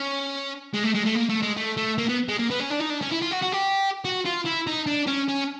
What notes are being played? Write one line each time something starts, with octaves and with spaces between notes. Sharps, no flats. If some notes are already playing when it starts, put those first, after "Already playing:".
Already playing: C#4
G#3
A3
G#3
A3
A#3
A3
G#3
A3
A3
A#3
B3
G#3
A#3
B3
C#4
D4
D#4
D4
C#4
E4
F4
F#4
F#4
G4
F#4
F4
E4
D#4
D4
C#4
C#4